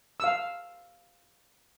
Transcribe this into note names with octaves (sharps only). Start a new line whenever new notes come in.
F5 E6